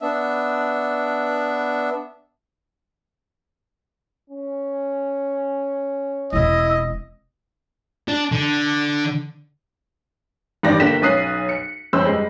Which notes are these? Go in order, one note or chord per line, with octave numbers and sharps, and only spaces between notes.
B3 D4 E5
C#4
E1 C4 E4 D#5
D4
D3
A1 G2 D#3 G4 D5 A#6
G1 D3 A#3 G5 B6 E7
B1 C#4 D#6 F#6 C7
C#7
G1 F2 C#4 C5 E6
G3 G#3